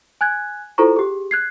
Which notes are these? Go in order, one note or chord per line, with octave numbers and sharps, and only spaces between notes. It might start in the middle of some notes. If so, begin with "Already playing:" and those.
G#5 F#6 G#6
E4 F4 A4 C5 A#5 C#6
G4 G#4
F#6 G#6 C7